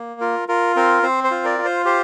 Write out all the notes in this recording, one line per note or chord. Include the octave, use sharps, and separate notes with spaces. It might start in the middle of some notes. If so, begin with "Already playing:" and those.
Already playing: A#3
F4 A#4
F4 A#4
C4 A#4
C4 C5
C5
F4
A#4 D5
F4
C5
G4 C5